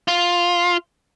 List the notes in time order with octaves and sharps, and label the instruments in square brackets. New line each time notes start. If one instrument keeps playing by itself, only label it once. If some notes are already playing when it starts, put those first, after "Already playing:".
[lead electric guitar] F4